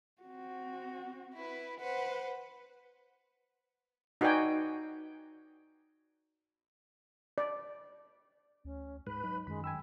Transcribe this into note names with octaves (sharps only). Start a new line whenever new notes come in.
C4 F#4
E4 B4
B4 C5 F#5
D#4 F#4 B4 D5 G5 G#5
D5
D2 C#4
G#2 B4 B5
F#3 D#4
F#2 D#3 G#3 B5
G5 G#5 B5 E6